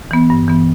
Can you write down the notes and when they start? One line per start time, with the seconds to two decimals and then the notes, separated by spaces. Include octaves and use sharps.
0.11 E3 B3
0.30 G2
0.48 E3 B3